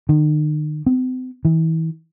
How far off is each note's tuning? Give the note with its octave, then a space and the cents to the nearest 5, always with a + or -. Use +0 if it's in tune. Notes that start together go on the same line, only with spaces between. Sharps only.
D#3 -40
C4 -40
E3 -35